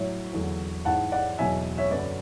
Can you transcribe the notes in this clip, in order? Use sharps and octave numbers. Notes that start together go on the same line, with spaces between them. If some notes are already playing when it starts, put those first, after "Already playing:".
Already playing: A2 F#3 C#5 E5
E2 D3 F#3
G#2 E3 G#3 F#5 A5
D5 F#5
E2 B2 F#3 E5 G#5
C#5 E5
F#2 D3 F#3 B4 D5